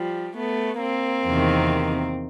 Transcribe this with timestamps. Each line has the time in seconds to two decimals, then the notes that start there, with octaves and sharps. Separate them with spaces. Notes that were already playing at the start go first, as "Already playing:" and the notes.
Already playing: F3 G3
0.36 A3 B3
0.81 A#3 C4
1.27 E2 C3 D#3